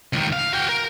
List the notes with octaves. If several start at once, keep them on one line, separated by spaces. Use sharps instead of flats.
C#2 D#3
F5
F#4 G5
A#4